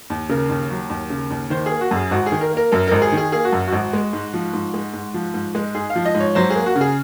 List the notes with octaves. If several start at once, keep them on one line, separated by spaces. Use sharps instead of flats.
D#2
C#3 A#4
D#2
F#3
D#2
C#3
D#2
D#3 C5
A#3 G#4
F#4
F#2 G#4
G#1 F#4
G#4
D#3
A#4
A#3
A#4
F#2 A#4
G#1 A#4
G#4
D#3
G#4
A#3 G#4
F#4
F#2
G#1 F#4
G#3
G#2
F3
G#2
G#3
G#2
F3
G#2
G#3
G#2 G#4
F5
F3
D#5
G#2
C#5
F#3 C5
A#3 G#4
F#4
C#3
G#4